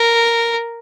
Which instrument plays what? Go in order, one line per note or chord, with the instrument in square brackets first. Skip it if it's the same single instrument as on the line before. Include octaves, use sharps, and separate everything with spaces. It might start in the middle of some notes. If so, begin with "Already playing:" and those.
Already playing: [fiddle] A#4